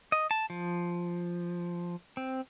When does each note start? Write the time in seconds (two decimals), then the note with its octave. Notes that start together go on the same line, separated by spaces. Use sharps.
0.12 D#5
0.31 A5
0.50 F3
2.17 C4